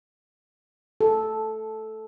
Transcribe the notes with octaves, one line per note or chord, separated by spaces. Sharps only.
A4